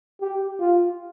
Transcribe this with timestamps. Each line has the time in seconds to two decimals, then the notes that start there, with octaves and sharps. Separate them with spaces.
0.21 G4
0.60 F4